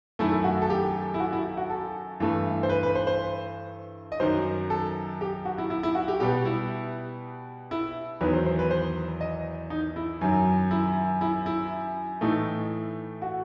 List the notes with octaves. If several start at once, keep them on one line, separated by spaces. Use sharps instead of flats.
F#2 D#3 A3 E4
E4
F#4
A4
G4
E4
F#4
E4
F#4
A4
G2 E3 A3
C5
B4
B4
C5
C5
D#5
F#2 D#3 F#3 C5
A4
G4
F#4
E4
E4
E4
F#4
G4
B2 G3 B3 G4
E4
E4
E2 D#3 F#3 B3 B4
C5
C5
B4
C5
D#5
D#4
E4
F#2 D#3 F#3
E4
E4
E4
A2 E3 A3 D#4
F#4